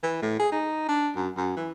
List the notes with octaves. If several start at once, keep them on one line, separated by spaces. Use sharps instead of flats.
E3
A2
G#4
D#4
D4
F#2
F#2
E3